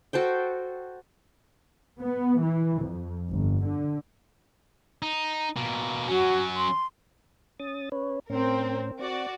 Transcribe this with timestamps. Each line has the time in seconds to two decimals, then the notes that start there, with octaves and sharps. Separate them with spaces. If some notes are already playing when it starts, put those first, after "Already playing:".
0.13 F#4 A4 C5 G5
1.99 B3
2.40 E3
2.81 F2
3.30 G1
3.67 D3
5.02 D#4
5.56 B2 A#3
6.08 F#3 C#4 F#4
6.56 C6
7.59 C#4 D#6 A6
7.92 C#4 B4 C#5
8.30 A2 C4 C#4 A#4
8.99 C4 F#4 D5